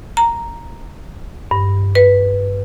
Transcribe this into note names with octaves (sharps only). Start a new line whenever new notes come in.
A#5
G2
B4